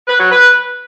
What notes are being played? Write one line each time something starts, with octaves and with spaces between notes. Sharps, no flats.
B4
F#3
B4